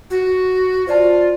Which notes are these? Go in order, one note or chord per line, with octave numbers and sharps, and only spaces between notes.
F#4
F4 C5 D5 A5